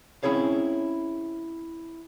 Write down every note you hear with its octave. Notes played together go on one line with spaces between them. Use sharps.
C4 C#4 E4 G#4 C#5 F5